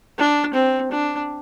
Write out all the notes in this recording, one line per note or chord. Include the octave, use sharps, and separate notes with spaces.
D4
C4
D4